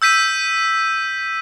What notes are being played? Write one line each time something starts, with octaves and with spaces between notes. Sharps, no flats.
E6 G6 B6 D#7